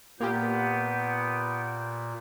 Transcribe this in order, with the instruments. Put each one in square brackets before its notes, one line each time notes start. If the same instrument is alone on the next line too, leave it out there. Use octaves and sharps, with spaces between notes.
[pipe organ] A#2 [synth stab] A#3 F4 G4 [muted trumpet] B3 [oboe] G5